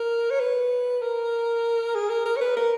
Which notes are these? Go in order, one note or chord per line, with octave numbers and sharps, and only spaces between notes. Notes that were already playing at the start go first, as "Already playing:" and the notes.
Already playing: A#4
C#5
B4
A#4
G#4
A#4
A#4
C#5
B4
A#4